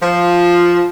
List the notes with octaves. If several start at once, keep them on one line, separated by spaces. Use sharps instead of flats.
F3